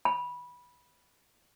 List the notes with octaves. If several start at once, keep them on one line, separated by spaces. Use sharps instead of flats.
B5